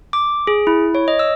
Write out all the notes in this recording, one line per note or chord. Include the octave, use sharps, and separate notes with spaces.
D6
G#4
E4
C#5
D#5
E6